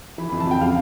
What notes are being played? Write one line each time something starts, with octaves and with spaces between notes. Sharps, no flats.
E3 B5
F2 B5
A5
F2 G5
C#3 F5